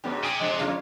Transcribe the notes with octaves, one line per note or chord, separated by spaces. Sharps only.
G#2 C#3 F#3 B3 D4 G4
C3 G#5 D#6
F3 G#3 D4 D#5
F2 G#2 D3 F4 C#5 F5